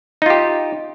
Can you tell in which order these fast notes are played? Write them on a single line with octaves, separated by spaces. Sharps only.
D#4 F4 G4